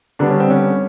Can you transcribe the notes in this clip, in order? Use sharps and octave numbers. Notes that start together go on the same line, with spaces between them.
D3 G3 B3 D4
C#4
C4
C#4